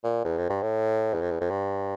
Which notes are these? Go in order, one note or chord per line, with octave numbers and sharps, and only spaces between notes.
A#2
E2
F2
G2
A2
E2
F2
E2
F2
G2